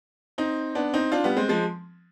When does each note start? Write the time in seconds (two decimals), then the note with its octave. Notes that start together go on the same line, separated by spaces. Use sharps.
0.38 C4 D#4
0.75 B3 D4
0.94 C4 D#4
1.12 D4 F4
1.24 G3 B3
1.37 G#3 C4
1.49 F3 G#3